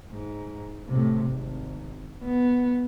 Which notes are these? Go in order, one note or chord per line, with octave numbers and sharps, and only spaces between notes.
G#2
A2 C3
G#1
B3